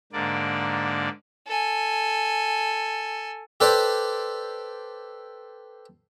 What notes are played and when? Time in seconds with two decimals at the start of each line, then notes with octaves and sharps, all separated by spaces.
0.13 G#2 D3 A#3 D5
1.47 A4 G#5
3.60 G4 A4 B4 C5 D5